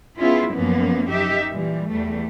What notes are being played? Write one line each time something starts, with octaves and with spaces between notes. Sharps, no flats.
B3 C#4 E4 F4 G#4
F#2 F3 A#3 B3 C#4
F#2 D#4 G4 E5
A#2 E3 G3
E2 G3 A3